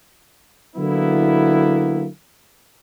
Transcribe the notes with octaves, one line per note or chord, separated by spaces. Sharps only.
D3 F#3 A#3 B3 E4